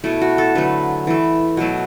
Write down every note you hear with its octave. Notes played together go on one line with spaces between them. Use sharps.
B2 A3 E4
F#4
A4
D3 F#3 A3 B4
E3 A3
B2 F#3 A3